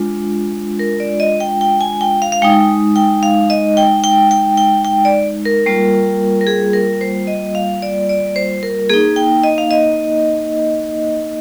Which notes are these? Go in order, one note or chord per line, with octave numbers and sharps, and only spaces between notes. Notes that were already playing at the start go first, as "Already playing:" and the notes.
Already playing: G#3 D4 F4
A#4
D5
D#5
G5
G5
G#5
G5
F5
F5
G#3 D#4 G5
G5
F5
D#5
G5
G5
G5
G5
G5
D5
A#4
G3 A#3 F4
A#4
G#4
A#4
C5
D#5
F5
D5
D5
C5
A#4
A#3 D#4 G#4
G5
D#5
F5
D#5